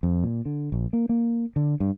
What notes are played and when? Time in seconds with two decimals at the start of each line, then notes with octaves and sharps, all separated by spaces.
0.03 F2
0.24 A#2
0.46 D3
0.72 A#1
0.93 A#3
1.09 A#3
1.56 D3
1.80 G2